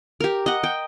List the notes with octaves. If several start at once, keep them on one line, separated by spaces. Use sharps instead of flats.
G4 A#4
D#5 F#5
G5